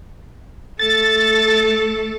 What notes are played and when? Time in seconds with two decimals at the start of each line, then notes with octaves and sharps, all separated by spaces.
0.79 A3 A4 A6